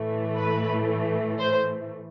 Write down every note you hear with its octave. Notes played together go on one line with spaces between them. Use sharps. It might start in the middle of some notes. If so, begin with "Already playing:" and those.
Already playing: A2 E3 A3
B4
C5